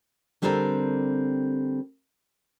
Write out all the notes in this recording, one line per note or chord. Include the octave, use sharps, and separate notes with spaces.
D3 G3 C4 D4 A4 A#4